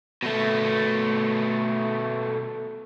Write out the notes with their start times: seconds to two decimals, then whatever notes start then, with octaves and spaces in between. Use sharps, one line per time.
0.23 B2 A3